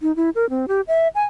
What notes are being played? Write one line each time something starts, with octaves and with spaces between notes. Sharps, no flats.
D#4
E4
A#4
C4
G4
E5
G#5